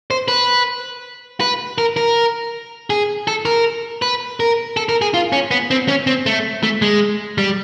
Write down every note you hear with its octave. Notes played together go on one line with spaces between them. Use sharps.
C5
B4
B4
A#4
A#4
G#4
A4
A#4
B4
A#4
A4
A#4
G#4
F4
C#4
B3
C4
C#4
C4
A3
A3
G#3
G3